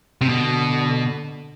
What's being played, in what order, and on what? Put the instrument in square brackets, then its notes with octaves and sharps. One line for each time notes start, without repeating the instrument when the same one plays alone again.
[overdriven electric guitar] C3
[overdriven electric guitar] B2 [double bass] D3